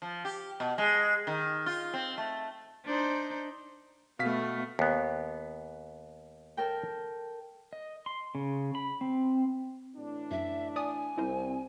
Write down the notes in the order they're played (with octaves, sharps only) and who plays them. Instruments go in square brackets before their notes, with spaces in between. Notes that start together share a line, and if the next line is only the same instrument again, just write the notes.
[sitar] F3
G4
B2
G#3
D#3
F4
C4
A3
[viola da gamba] D4 D#4 C5
[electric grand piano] B2 F5 B6 [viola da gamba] A3 B3
[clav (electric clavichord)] D#2 B3
[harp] A4 A#4 G5
[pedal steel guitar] D#5
C6
C#3
B5
C4
[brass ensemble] A2 E3 D4
[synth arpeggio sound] F#2 [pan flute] E5
[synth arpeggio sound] D5 D#6 [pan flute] G#5
[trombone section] C2 C4 [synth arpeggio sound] E4 A#4 C5